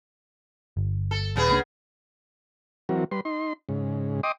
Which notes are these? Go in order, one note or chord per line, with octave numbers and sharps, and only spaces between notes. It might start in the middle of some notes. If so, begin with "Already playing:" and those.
G1
A4
D#1 C#3 B3 G#4
C#2 A#3 D4
E3 F#3 C4 F#4 A#4
G3 B4 C6
D#4 C6
G#2 C#3
D#5 G5 C6 D6 D#6